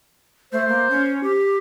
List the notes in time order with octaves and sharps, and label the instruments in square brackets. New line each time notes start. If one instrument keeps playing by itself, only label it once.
[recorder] A3 [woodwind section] C5
[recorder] A#3
C#4
G4